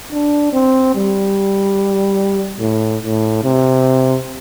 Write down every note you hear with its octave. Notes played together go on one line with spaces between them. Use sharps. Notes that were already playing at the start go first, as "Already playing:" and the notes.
D4
C4
G3
A2
A2
C3